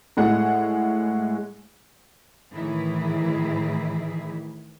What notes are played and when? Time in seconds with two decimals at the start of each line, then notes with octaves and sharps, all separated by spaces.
0.17 A2 G#3 F#5
2.52 A2 D#3 E3 E4 G#4